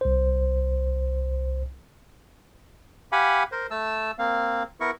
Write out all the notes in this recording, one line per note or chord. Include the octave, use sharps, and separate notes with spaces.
C2 C5
G4 F5 F#5 G#5 B5
A#4 C5
A3 A5 E6
A#3 C4 F5
B3 E4 A#4 C#6